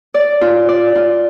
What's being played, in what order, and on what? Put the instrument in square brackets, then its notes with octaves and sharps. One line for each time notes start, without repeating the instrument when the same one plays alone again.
[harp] D5
F4
D5
F4